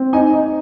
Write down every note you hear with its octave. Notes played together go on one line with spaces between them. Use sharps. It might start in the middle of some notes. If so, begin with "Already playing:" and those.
Already playing: C4
D#4 G#5
D#4